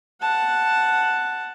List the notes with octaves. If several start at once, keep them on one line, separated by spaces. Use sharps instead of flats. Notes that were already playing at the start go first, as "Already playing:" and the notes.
F#5 A5